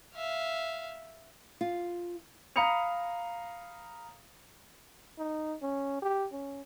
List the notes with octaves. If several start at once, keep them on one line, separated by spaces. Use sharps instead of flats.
E5 F5
F4
F5 A#5 B5 D#6 C#7 F7
D#4
C#4
G4
C#4